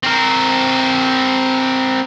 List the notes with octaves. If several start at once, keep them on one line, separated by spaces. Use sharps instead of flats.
C4 A#4